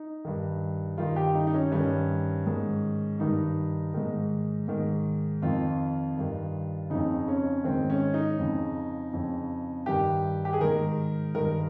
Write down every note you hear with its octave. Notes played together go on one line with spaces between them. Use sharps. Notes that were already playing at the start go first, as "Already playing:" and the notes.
Already playing: D#4
G2 D#3
G2 D#3 F4
G4
D#4
D#4
C#4
G2 D#3 C#4
G#2 D#3
G2 D#3 D#4
G#2 D#3
G#2 D#3
F2 D#3 F4
G2 D#3
F2 C#3 D#4
C#4
G#2 D#3 C4
C#4
D#4
F2 C#3
F2 C#3
G2 D#3 G4
G4
G#4
G#2 D#3 A#4
G2 D#3 A#4